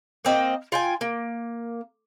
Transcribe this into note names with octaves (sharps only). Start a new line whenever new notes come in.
A#3 C4 D#5
F4 G5 G#5
A#3